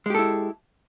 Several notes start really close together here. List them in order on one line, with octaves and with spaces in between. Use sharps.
G#3 G4 A4 E4